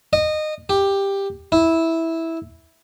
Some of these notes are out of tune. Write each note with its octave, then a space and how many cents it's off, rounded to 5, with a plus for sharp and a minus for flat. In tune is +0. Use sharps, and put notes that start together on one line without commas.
D#5 -20
G4 +10
E4 -10